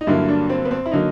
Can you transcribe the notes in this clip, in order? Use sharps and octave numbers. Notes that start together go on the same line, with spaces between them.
D#4
G2 D3 F#3 A#3 E4
D4
C4
B3
C4
E4
D3 F#3 A#3 D#4